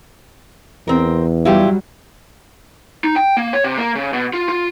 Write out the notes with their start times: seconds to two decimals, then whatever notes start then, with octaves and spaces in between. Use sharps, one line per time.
0.87 E2 C4 A#4
1.45 F#3 G3 E4 F4 G4
3.04 D#4
3.16 G5
3.37 A#3
3.53 C#5
3.64 C3
3.78 A#3
3.95 C#3
4.13 B2
4.33 F4
4.49 F4